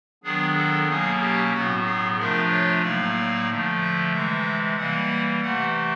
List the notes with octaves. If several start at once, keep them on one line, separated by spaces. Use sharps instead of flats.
D#3 F#3 B3 D4 G#4
A4
B2 F#3 A#3 C#4 G#4
G4
A2 F#3 B3 F#4
G#4
C3 F3 A3 D4 F4 A#4
C#5
A2 F#3 A#3 D#4 D5
D3 F3 A3
E5
C3 E3 G#3 E5
E3 G3 A#3 F#5
C3 E3 A3 F#5